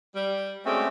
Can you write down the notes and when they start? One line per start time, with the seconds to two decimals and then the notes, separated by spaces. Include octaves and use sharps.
0.15 G3
0.65 G#3 A3 C4 C#4 F#4 D5